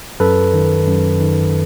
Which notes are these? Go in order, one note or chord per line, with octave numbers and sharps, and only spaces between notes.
F#2 A4 B4
D#3
F#2
D#3